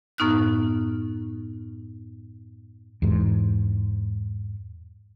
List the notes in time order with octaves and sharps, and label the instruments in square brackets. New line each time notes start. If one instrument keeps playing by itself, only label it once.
[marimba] F#2 A2 B3 D#4 F6 F#6
[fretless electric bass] E2 G#2